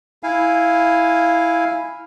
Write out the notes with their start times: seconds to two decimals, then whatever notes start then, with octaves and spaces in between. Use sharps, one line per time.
0.23 E4 F5 G#5